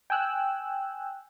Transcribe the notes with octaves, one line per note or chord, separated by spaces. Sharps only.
G5 G#5 E6 F#6